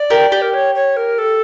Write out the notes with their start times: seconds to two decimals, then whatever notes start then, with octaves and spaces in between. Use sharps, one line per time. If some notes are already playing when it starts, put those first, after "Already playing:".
Already playing: D5
0.10 G4 A#4
0.32 G4
0.42 A#4
0.54 C#5
0.75 C#5
0.97 A#4
1.18 A4